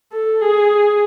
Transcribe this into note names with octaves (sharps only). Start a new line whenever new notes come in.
A4
G#4